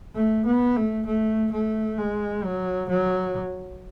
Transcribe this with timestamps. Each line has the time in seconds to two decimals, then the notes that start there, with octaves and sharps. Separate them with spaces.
0.15 A3
0.46 B3
0.76 A3
1.06 A3
1.52 A3
1.98 G#3
2.44 F#3
2.89 F#3